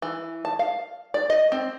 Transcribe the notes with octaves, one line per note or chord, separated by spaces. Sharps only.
E3
A5
F5
D5
D#5
C4